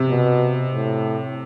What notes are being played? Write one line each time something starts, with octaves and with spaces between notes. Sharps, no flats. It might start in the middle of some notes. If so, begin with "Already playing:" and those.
Already playing: C3
B2
A2